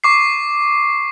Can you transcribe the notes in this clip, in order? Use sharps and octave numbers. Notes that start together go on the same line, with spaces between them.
C#6 D6 C7